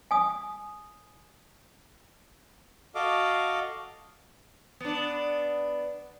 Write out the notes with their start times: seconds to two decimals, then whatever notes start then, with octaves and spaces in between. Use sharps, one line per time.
0.11 G#5 D#6
2.95 F#4 A4 D#5 F5 D6
4.80 B3 D4